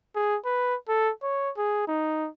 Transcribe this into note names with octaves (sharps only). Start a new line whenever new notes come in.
G#4
B4
A4
C#5
G#4
D#4